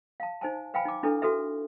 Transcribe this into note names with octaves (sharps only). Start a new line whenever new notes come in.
F5 A5
D#4 C5 G#5 A5
B4 F5 G5 G#5 B5
D#4 D6
D4 E4 A4 B4
F#4 A4 B4 E5